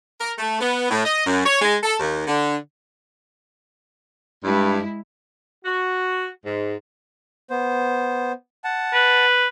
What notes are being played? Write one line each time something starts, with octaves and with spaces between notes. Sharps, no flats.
A#4
A3
B3
A2
D#5
F#2
C#5
G#3
A4
D#2
D3
G2 G#3 E4
F#4
G#2
B3 C5
F#5 A5
B4